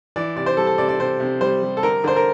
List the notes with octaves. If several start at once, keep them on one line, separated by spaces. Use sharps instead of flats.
E3 D5
C3 D5
C5
G3 A4
A4
C3 D5
D5
C3 C5
C3
G3 C5
G3
A4
D3 A#4
D3 C5
A#4